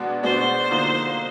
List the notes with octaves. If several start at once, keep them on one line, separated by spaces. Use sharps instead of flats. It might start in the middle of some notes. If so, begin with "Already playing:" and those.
Already playing: B2 G#3 B3 D4 F#4
B2 G#3 B3 D4 F#4 C5
D3 F3 A#3 D#4